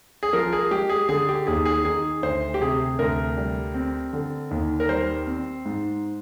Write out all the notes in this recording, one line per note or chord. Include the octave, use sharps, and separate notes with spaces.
G#4
F3 A#4
G#4
G#3 G4
G#4
D3 G#4
G4
D#2 G#4
G#4
D#3 G#4
D2 C5
G4
C3 G#4
D2 A#4
G3
C4
D3
D#2
A#4
G3 C5
C4
G#2